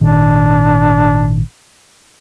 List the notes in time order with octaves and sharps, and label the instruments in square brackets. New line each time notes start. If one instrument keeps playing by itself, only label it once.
[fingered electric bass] G#1 A#2 D#3 [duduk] D4